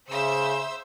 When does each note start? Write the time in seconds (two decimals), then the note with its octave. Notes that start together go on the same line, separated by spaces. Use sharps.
0.11 C#3 C5 E5 E6